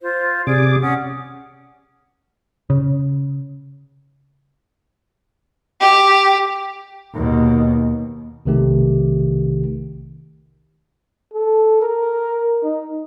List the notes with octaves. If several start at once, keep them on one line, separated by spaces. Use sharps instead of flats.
F4 C5
C3 G#4 D5 D6
C#4 F#5 D#6
C#3
G4
D#2 B2
B1 C3 D#3 A3 G4
A4
A#4
D#4